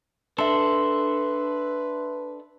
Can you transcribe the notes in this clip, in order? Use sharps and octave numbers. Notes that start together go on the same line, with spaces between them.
D4 A4 B4 E5 C6